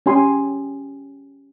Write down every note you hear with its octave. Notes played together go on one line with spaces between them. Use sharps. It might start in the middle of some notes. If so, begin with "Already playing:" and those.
C#4 G4 G#5 C6